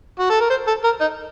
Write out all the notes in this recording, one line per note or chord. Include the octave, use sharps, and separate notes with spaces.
F#4
A4
A#4
C5
A4
A#4
D#4